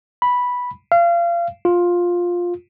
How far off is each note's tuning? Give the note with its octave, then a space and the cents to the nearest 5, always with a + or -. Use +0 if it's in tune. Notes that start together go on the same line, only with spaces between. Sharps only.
B5 -5
F5 -30
F4 +10